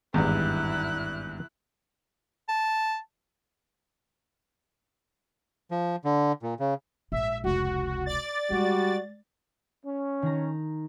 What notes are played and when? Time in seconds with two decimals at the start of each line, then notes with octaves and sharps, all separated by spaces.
0.14 G#1 E2 G2 E4 F#6
2.49 A5
5.71 F3
6.05 D3
6.43 A#2
6.60 C#3
7.12 A#1 G#2 E5
7.44 F1 C#2 F#4
8.06 D5 A6
8.51 G3 G#3 F#4
9.85 C#4
10.22 D#3 A#5